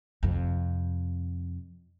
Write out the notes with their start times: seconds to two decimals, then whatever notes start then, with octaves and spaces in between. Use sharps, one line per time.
0.23 F2 C3